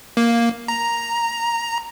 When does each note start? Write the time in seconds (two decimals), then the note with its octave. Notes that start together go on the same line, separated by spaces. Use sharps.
0.17 A#3
0.68 A#5